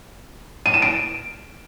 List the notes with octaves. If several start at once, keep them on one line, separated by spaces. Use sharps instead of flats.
D#7
E7
D7